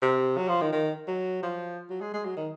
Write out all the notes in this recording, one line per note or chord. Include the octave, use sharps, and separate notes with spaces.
C3
F#3
F3
D#3
D#3
F#3
F3
F#3
G#3
G#3
F#3
D#3